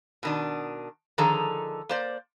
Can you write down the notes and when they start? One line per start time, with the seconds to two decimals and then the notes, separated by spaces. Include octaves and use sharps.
0.23 B2 D#3 D4
1.18 D3 D#3 F3 G#4 A4 A#5
1.89 A#3 C5 D5